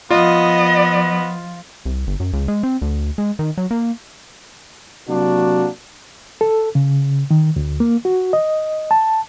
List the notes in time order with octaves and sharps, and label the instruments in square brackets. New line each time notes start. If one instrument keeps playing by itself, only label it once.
[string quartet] F3 [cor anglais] B3 [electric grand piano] F4 [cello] D#5
[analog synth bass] C2
G1
F#2
C#2
G#3
C4
D2
G#3
D#3
F#3
A#3
[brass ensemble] C3 F#3 A#3 D4 F#4
[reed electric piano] A4
C#3
D#3
D2
A#3
F#4
D#5
A5